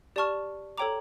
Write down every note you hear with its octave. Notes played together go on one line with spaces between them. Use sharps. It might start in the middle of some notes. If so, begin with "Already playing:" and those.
G4 D5 A5 C#6 F6
A4 C#5 G5 A#5 D6